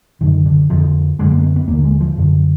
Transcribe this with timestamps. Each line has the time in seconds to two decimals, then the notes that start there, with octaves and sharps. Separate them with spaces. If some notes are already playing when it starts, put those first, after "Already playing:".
0.21 F#2 D3 D#3
0.46 D3
0.70 F2 D3 F3
1.19 F#2 D3 G#3
1.31 A#3
1.43 B3
1.56 B3
1.68 D#2 A#3
1.73 D3
1.84 G#3
2.01 F3
2.17 F#2 D3